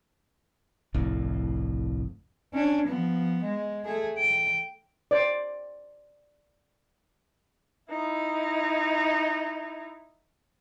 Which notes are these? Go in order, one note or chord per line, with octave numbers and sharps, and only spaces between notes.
G1 C2 F2 A2
C#4 D4
F3 B3
G#3
A3 G#4
G5
C5 D5
D#4 E4